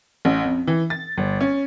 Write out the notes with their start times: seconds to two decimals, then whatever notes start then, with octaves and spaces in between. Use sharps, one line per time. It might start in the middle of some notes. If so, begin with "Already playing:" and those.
0.25 A1
0.44 F2
0.67 E3
0.90 A6
1.18 G1
1.41 C#4